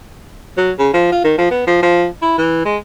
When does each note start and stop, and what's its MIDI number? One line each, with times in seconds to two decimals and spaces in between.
0.58 0.72 54
0.78 0.89 49
0.93 1.10 53
1.12 1.20 65
1.24 1.35 51
1.38 1.50 53
1.50 1.65 59
1.67 1.80 53
1.82 2.07 53
2.22 2.35 64
2.38 2.61 52
2.65 2.77 56